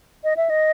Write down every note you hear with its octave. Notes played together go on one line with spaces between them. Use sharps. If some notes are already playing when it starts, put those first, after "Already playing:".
D#5
E5
D#5